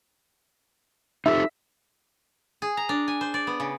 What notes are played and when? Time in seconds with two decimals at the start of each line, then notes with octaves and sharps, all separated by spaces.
1.26 D#4 G4 A4 E5
2.62 G#4
2.77 A#5
2.89 D4
3.08 G#5
3.21 C5
3.34 D5
3.47 B3
3.60 C#3